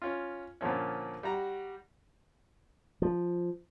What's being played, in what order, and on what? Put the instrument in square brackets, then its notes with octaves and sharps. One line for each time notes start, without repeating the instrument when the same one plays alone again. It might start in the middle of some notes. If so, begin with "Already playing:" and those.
[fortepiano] C#4 F4
A#2 D3 F3 C#4
G3 F#4 A#5
[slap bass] F3